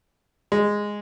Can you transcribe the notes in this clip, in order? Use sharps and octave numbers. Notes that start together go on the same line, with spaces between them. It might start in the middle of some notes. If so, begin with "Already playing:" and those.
G#3